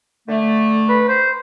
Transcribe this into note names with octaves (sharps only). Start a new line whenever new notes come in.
D3 A3
B4
C5